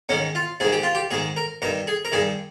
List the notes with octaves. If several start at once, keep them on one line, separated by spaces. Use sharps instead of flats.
G#2 D#3 C#4
F4
G#2 D#3 G#4
G4
F4
G4
G#2 D#3 G#4
A#4
G2 D#3 A#4
G#4
A#4
G2 D#3 G#4